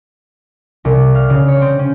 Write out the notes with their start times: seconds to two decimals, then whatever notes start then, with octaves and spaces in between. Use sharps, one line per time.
0.85 C2
1.15 F5
1.30 C#3
1.48 C#5
1.61 C4
1.79 C#4